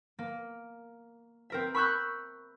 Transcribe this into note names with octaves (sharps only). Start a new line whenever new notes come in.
A#3
C4 A#4 E5
B5 C#6 E6 F#6 G6